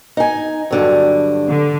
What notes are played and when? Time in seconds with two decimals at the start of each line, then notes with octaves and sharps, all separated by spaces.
0.17 D#4 G#5
0.70 G2 D3 F#3
1.49 D3